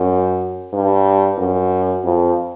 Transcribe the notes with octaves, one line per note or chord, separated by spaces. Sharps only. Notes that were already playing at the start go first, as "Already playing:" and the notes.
Already playing: F#2
G2
F#2
F2